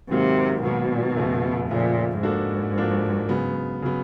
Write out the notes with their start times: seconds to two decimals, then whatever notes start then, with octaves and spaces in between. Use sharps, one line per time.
0.10 G#2 C3 D#3 F#3 A#3
0.63 G#2 B2 D#3 F#3 A#3
1.16 F2 C#3 F3 A3
1.70 F2 A#2 C#3 F3 A3
2.23 G#2 F3 A#3 D4 F#4 A4
2.76 F3 A#3 D4 F#4 A4
3.29 C#3 F#3 B3
3.82 C#3 F#3 B3